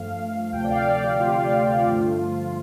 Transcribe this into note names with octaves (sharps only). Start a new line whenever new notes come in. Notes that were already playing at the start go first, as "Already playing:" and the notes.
Already playing: G2 F3 A3 F5
D2 C3 F3 A3 G5
D5
F5
D5
G4
F4
G2 D3 F3 A3